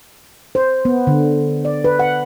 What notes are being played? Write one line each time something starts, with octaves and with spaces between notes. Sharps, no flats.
C5
B3
D3
D5
B4
F#5